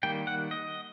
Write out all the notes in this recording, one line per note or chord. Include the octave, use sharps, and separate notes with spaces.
D#3 G3 A#3 G5
F#5
D#5